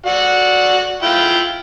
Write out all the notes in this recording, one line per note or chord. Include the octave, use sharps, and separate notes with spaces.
F#4 D5 F#5
E4 F4 G5